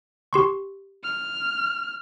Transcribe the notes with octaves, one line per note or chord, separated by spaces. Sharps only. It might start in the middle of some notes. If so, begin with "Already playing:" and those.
G4 C6 C#6
F6